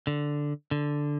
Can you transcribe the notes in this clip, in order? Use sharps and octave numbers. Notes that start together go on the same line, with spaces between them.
D3
D3